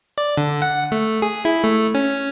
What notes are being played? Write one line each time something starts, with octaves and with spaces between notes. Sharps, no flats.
D5
D3
F#5
A3
G#4
E4
A3
C#4